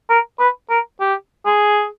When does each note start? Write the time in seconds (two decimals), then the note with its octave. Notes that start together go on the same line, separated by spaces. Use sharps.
0.10 A#4
0.39 B4
0.70 A#4
1.00 G4
1.46 G#4